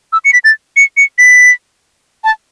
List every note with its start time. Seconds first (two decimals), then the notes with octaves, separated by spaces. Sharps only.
0.13 E6
0.25 C#7
0.33 B6
0.44 A6
0.77 C#7
0.97 C#7
1.18 B6
2.24 A5